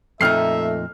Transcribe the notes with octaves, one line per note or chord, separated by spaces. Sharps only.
F2 A#2 A3 D#4 E5 F6 C7